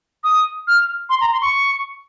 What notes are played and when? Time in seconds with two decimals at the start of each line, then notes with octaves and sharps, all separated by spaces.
0.24 D#6
0.68 F6
1.10 C6
1.21 A#5
1.32 C6
1.42 C#6